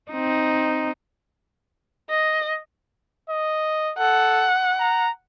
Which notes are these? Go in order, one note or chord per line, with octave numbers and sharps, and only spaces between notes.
C4 D#4
D#5
D#5
A4 F#5
A#5